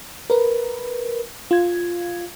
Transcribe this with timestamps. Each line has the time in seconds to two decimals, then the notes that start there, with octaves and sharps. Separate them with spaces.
0.30 A#4 B4
1.51 F4 G#6